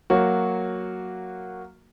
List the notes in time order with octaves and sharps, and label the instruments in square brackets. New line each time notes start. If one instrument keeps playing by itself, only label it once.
[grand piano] F#3 A#3 F#4